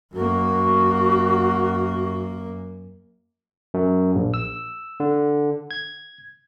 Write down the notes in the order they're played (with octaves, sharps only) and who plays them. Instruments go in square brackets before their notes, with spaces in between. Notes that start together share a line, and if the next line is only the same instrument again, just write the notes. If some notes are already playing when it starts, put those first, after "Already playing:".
[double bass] F#2 A#3 [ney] F#4
[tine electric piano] F#2
A#1
E6
D3
G#6